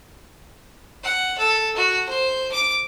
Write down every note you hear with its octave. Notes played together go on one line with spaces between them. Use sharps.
F#5
A4
F#4
C5
D6